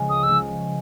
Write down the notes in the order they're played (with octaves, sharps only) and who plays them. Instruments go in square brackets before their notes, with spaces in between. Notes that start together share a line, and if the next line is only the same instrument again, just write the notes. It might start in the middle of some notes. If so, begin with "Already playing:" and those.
Already playing: [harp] C#3 F3 G#3 C#4
[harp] C#2 [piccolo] D#6
[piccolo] E6
[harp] C#3 F3 G#3 C#4